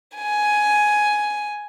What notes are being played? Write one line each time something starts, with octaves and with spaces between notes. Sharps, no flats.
G#5